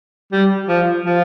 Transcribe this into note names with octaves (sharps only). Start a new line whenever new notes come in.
G3
F3
F3